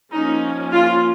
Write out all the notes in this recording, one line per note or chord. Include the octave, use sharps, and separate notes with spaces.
F3 A#3 C#4 D#4
F4